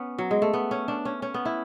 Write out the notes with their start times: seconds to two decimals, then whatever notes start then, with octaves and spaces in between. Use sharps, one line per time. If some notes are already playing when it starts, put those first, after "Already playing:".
Already playing: B3 C#4
0.18 F#3
0.31 G#3
0.42 A3
0.53 B3
0.71 C#4
0.88 D4
1.05 C#4
1.22 C#4
1.34 B3
1.45 E4